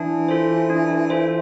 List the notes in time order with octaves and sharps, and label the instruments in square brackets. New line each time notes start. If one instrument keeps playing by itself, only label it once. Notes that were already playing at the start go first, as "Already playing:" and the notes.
Already playing: [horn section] E3 [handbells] D4
[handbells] F4 A4 C5
D4
F4 A4 C5